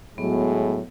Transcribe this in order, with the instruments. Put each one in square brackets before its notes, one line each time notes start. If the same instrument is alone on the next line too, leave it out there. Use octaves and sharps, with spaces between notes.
[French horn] A2 [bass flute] F#3 [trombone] G#3 [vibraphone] B3